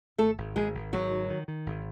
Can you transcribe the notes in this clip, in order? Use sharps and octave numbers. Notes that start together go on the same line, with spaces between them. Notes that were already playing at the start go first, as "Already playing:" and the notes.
G#1 A3 A4
G#1
G#1 G#3 G#4
G#1
G#1 F#3 F#4
D#3
D#3
D#3
G#1